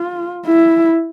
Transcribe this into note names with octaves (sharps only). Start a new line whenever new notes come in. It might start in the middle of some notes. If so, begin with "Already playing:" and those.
Already playing: F4
E4